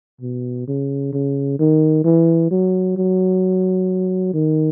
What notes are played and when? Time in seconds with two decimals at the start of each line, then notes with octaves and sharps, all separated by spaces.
0.21 B2
0.68 C#3
1.13 C#3
1.59 D#3
2.05 E3
2.51 F#3
2.97 F#3
4.34 D#3